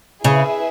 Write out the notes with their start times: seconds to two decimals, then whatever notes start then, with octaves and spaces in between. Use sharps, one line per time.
0.24 C#3 E4 G#4 B4 E5